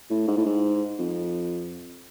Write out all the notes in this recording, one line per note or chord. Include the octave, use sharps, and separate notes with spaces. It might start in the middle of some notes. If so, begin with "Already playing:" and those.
A2
G#2
A2
G#2
F2